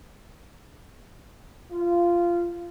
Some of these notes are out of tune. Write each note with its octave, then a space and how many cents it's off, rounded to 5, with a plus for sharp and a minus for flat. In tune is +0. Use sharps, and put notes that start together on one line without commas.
F4 -15